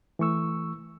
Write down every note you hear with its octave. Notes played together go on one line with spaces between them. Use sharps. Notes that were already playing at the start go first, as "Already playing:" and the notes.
E3 A3 C#6 E6